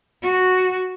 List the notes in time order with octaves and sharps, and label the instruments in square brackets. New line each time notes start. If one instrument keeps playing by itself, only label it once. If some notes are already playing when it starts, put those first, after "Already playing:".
[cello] F#4